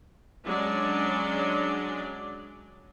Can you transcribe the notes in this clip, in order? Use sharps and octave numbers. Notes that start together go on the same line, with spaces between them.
F#3 G#3 C#4 D4 D5